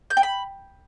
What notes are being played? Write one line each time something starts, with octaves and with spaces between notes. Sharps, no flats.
G6
G5
B5